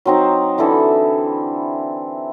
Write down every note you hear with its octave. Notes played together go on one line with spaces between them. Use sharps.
F#3 C4 D#4
D3 E3 E4 A4